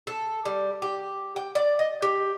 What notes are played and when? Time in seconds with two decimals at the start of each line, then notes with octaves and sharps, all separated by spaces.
0.07 A4
0.45 G3
0.82 G4
1.36 G5
1.55 D5
1.79 D#5
2.02 G4